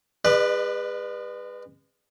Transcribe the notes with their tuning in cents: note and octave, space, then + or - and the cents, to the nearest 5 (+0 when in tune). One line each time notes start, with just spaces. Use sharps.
G#3 -35 B4 +0 D5 +35